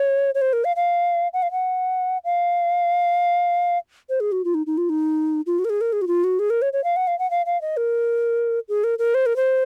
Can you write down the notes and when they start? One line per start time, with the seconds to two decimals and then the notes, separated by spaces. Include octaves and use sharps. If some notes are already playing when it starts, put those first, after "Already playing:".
Already playing: C#5
0.35 C#5
0.41 C5
0.53 A#4
0.65 F5
0.76 F5
1.33 F#5
1.43 F5
1.52 F#5
2.25 F5
4.10 C5
4.20 G#4
4.32 F#4
4.45 F4
4.54 D#4
4.67 D#4
4.78 F4
4.89 D#4
5.46 F4
5.59 F#4
5.65 A#4
5.70 G#4
5.81 A#4
5.93 G#4
6.02 F#4
6.07 F4
6.24 F#4
6.39 G#4
6.50 A#4
6.62 C#5
6.73 C#5
6.84 F5
6.96 F#5
7.07 F5
7.19 F#5
7.31 F5
7.46 F5
7.61 D#5
7.77 A#4
8.69 G#4
8.84 A#4
8.99 A#4
9.14 C5
9.26 A#4
9.36 C5